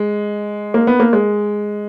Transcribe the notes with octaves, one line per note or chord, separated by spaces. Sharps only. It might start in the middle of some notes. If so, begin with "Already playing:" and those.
Already playing: G#3
A#3
B3
A#3
G#3